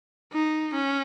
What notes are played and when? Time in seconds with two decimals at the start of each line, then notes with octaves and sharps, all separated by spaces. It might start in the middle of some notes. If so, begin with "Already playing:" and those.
0.33 D#4
0.74 C#4